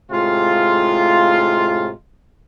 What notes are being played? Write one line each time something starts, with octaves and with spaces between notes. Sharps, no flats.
A2 C3 G#3 F4